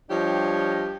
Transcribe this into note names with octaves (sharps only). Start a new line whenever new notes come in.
F3 G3 D4 G4 C#5 D#5